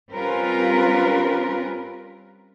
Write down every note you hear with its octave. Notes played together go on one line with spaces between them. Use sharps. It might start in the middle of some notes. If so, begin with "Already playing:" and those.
G3 C4 C#4 F4 A#4 B4